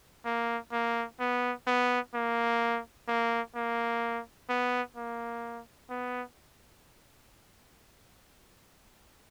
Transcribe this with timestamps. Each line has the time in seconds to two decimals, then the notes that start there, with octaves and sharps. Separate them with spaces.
0.25 A#3
0.72 A#3
1.20 B3
1.67 B3
2.14 A#3
3.08 A#3
3.55 A#3
4.49 B3
4.96 A#3
5.90 B3